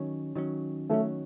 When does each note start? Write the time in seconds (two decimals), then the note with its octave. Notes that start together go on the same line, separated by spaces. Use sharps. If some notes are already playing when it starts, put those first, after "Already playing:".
Already playing: D#3 F#3 C#4
0.36 D#3 F#3 C#4
0.90 D#3 F#3 A3 C#4